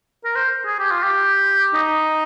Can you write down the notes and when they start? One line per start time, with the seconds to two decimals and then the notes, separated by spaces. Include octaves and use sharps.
0.25 A#4
0.36 C5
0.66 G#4
0.79 G4
0.91 F4
1.03 G4
1.74 D#4